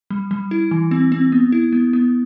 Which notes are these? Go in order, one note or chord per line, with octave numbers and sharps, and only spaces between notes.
G3
G3
E4
E3
C4
C4
B3
E4
B3
B3